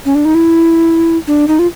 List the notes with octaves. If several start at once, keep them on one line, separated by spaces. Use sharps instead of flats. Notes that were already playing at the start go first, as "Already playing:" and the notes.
C#4
D4
D#4
E4
D4
D#4
F4